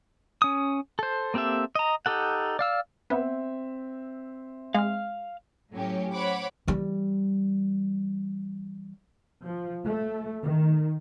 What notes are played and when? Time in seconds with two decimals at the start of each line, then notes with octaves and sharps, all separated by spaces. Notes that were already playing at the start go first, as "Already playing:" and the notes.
0.42 C#4 D#6
0.99 A4 C5
1.34 A#3 C4 G4 A4 E5
1.75 D#5 A#5
2.06 D#4 G4 A4 F#5
2.59 D5 F5 E6
3.10 B3 C4 E5
4.75 G#3 F5 F6
5.74 A2 F#3 C#4 G4
6.13 C5 C#5 F#5 B5 D6
6.67 E3 G3
9.43 F3
9.84 A3
10.40 D#3